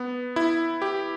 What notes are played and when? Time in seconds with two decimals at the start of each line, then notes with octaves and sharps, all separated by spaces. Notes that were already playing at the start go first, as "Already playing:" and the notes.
Already playing: B3
0.36 E4
0.82 G4